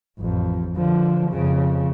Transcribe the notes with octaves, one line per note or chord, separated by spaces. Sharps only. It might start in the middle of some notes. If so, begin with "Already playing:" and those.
A1 F2
D3 F3
F2 C#3